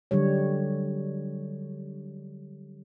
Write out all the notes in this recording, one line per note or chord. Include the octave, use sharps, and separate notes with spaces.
D3 F#3 G3 C#5